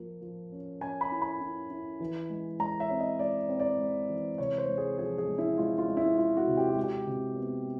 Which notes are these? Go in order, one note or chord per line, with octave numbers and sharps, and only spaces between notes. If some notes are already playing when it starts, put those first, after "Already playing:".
Already playing: F3 A#3
F3
C#4
C#4 G#5
B5
E4
B5
E4
E4
E3
G#3
G#3 A#5
E5
C4
D#5
G#3 D5
C4
D5
G#3
E3
C3 C#5
C5
G#3
G#4
F3 G#4
G#4
G#3
E4
G#3 F4
F4
G#3
E4
G#3 F4
F#4
C3
G4
F#4
G#3
G4
C3
B3